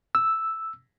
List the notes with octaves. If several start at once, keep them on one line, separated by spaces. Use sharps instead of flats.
E6